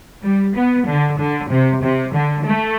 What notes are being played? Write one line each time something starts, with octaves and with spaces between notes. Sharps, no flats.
G3
B3
D3
D3
C3
C3
D3
A3